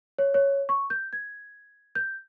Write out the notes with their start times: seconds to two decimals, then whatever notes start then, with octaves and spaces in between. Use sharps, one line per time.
0.19 C#5
0.34 C#5
0.69 C#6
0.90 G6
1.13 G#6
1.95 G6